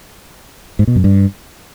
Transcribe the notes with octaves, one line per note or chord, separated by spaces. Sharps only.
G#2
B2
F#2
G2